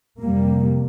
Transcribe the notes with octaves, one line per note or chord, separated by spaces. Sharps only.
F2 C3 G3 A#3